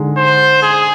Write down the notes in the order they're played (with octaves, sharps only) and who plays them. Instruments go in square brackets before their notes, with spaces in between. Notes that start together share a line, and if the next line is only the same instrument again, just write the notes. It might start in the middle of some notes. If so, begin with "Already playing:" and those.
Already playing: [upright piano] D3 G#3 D#4
[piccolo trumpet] C5
G#4